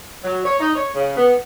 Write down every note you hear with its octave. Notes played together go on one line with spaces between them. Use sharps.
F#3
C#5
D#4
C#5
C#3
B3